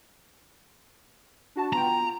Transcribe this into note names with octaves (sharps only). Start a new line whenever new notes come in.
D4 F#4 A5
B3 F4 G5 A#5